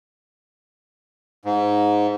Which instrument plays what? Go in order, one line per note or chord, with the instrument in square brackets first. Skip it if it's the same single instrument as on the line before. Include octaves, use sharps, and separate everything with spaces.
[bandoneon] G#2